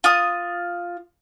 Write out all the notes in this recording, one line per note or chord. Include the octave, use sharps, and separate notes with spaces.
F4 D#6